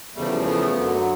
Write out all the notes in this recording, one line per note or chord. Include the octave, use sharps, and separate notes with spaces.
E2 C#3 F3 G3 A3
A3 B3
F#2 D3 F#3